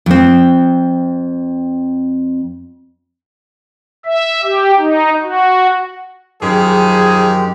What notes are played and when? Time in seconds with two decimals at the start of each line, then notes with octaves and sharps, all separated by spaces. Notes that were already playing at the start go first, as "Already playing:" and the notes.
0.06 F2 C4
4.06 E5
4.44 G4
4.78 D#4
5.23 F#4
6.42 F#2 D#3 F3 G#3 G4 G#4